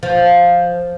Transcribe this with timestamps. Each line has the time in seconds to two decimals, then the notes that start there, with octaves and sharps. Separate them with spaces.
0.03 F3